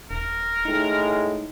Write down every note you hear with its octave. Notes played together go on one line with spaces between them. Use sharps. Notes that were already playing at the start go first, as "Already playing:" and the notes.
D#1 A#4
A2 G#3 D#4